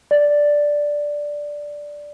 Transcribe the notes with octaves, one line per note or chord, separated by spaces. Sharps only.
D5